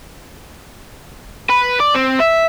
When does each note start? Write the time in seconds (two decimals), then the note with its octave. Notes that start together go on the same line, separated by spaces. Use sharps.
1.50 B4
1.80 D5
1.95 C4
2.20 E5